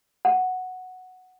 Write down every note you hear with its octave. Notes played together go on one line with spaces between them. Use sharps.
F#5